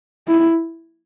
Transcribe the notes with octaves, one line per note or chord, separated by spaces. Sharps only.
E4